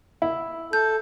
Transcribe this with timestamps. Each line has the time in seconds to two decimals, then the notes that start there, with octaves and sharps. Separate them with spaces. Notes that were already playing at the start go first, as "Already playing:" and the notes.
0.22 E4
0.73 A4 G6